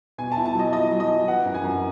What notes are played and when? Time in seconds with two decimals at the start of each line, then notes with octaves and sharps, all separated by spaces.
0.18 B2 G#5
0.32 A5
0.37 E4
0.45 A5
0.55 F#3 D#5
0.72 E4 D#5
0.91 F#3
1.00 D#5
1.09 E4
1.27 E3 F#5
1.46 F#2
1.54 G#5
1.64 F#2